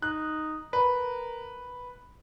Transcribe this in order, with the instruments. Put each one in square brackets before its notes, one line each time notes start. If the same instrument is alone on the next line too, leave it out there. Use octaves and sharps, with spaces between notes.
[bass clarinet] D#4 [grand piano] F#6
[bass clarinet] A#4 [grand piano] B4